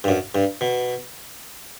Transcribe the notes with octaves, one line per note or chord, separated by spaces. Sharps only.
G2
F#2
G2
B2